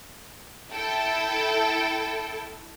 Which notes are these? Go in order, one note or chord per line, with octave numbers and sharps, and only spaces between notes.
E4 A4 G5